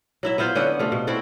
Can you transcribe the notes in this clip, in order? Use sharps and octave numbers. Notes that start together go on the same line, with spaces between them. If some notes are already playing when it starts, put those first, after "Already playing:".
F#3 E4 E5
B3 E4 F4 C5
D3 B3 C#4 F#5
C3 A3 F4
B2
C4 E4 F#4 A4